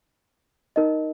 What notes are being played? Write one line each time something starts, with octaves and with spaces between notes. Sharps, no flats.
D#4 A#4 D#5